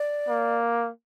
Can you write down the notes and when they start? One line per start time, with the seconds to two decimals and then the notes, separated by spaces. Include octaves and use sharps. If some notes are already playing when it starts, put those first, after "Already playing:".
Already playing: D5
0.27 A#3